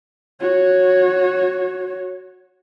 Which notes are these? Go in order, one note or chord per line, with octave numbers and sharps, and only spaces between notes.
F#4 C#5